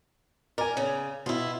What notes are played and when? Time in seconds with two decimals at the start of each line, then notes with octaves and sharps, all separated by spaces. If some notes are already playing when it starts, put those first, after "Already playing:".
0.58 A#4 D5 G#5
0.77 C#3
1.26 B2 E4 F4